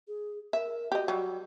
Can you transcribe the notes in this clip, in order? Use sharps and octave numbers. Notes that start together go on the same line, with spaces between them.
G#4
A#4 E5
F#4 G4 D#5
F#3 G3